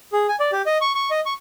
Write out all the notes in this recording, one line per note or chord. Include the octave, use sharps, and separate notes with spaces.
G#4
G#5
D5
G4
D#5
C#6
C#6
D#5
C#6